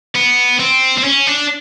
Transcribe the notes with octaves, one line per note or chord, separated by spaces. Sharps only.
B3
C4
C4
C#4
D4